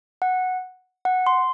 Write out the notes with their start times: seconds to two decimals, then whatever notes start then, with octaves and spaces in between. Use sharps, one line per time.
0.22 F#5
1.05 F#5
1.27 C6